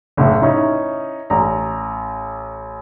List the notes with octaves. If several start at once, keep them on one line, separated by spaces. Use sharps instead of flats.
F#1 A2
C#4 D#4 E4
A1 A#5